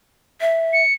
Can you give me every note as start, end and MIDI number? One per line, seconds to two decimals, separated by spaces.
0.41 0.82 76
0.73 0.94 97